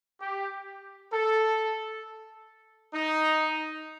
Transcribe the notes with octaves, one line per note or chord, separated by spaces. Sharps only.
G4
A4
D#4